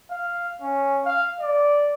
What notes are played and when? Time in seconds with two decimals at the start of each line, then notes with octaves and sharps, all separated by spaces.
0.11 F5
0.62 C#4
1.05 F5
1.41 D5